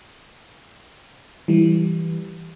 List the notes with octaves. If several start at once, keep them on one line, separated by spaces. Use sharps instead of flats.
E3 G3